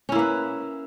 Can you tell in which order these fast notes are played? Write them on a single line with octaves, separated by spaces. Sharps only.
C#4 E4 A#3 B4